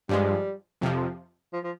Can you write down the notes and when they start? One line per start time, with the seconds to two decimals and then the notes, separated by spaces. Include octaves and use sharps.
0.09 G2 F3 G3 G#3
0.81 F2 C3 F3
1.53 F3
1.64 F3